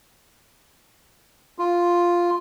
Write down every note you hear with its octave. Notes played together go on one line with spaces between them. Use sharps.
F4